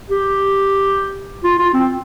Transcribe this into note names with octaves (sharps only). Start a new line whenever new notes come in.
G4
F4
F4
C4